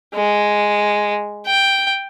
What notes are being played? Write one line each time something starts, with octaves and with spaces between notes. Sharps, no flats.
G#3
G5